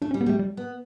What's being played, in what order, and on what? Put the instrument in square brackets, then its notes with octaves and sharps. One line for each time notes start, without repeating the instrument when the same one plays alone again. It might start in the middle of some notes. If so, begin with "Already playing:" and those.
[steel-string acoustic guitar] A3 [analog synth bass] D4
[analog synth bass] C#4
[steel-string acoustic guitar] G3
[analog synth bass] B3
[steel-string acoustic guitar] G3 [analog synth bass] A3
[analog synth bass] G3
[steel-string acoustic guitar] B3